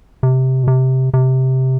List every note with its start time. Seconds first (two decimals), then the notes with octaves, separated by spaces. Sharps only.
0.23 C3
0.63 B2
0.68 C3
1.14 C3